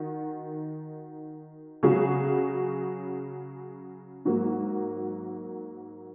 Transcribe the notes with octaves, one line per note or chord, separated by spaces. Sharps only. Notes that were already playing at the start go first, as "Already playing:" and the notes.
Already playing: D#3 F#4
C#3 F#3 C#4 G#4
G#2 F#3 A#3